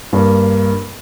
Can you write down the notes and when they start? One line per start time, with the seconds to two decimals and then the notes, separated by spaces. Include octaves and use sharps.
0.13 G2 A#3